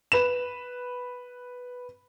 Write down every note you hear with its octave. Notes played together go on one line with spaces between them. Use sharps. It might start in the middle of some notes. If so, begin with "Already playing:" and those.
B4 E7